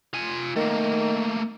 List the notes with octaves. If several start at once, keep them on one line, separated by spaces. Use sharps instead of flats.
F4 G#5
D#3 A3 A#3